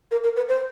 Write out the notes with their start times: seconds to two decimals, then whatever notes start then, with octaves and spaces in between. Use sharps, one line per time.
0.11 A#4
0.24 A#4
0.36 B4
0.49 C5